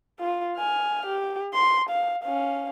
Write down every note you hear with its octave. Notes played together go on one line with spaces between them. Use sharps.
F4
G#5 F6
G4
C6
F5
C#4 F5